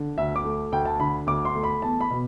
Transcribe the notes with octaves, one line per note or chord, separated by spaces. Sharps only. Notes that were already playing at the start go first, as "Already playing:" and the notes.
Already playing: D3
D2 E5
D6
A3
D2 G5
A5
D3 B5
D2 D6
C6
A3
B5
E2 A5
B5
B2